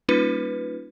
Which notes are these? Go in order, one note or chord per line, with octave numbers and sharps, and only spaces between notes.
G3 A#3 C#4 D#4 F4 B4